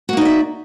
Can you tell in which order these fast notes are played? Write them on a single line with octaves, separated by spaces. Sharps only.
F#4 A#3 D#4 D5 E5